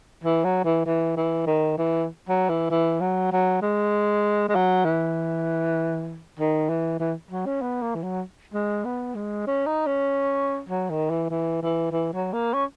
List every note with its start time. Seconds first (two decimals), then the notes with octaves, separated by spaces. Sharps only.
0.24 E3
0.45 F#3
0.65 E3
0.86 E3
1.17 E3
1.47 D#3
1.78 E3
2.29 F#3
2.49 E3
2.70 E3
3.01 F#3
3.32 F#3
3.62 G#3
4.49 G#3
4.55 F#3
4.85 E3
6.39 D#3
6.69 E3
7.00 E3
7.31 F#3
7.46 C#4
7.62 B3
7.82 A#3
7.95 E3
8.03 F#3
8.54 G#3
8.85 B3
9.15 G#3
9.47 C#4
9.66 D#4
9.87 C#4
10.69 F#3
10.90 D#3
11.10 E3
11.30 E3
11.62 E3
11.92 E3
12.13 F#3
12.33 A#3
12.54 C#4